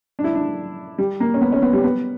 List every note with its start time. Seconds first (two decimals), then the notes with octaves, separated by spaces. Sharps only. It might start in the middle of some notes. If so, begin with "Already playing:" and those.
0.19 D4
0.24 E4
0.35 D4
0.98 G3
1.20 A#3
1.34 C#4
1.41 B3
1.52 C#4
1.62 B3
1.73 G3
1.84 B3